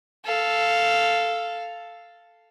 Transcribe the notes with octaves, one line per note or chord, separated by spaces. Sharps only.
A4 F5